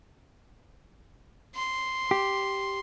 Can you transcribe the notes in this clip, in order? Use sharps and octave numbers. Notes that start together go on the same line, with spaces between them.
C6
G4